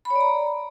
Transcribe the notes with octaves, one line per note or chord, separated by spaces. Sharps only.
B5
C#5
D5
A#5